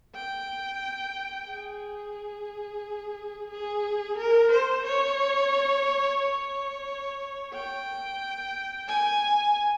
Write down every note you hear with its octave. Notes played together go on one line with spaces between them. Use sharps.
G5
G#4
G#4
A#4
C5
C#5
C#5
G5
G#5